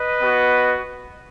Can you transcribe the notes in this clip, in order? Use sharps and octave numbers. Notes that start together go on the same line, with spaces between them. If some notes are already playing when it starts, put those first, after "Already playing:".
Already playing: B4 D#5
B3 F#4